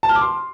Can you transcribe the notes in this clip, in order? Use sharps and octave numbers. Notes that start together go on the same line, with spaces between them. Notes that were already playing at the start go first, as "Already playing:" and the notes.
A5
F6
D6
C6